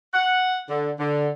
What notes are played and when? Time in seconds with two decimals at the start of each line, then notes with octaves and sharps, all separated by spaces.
0.14 F#5
0.69 D3
0.99 D3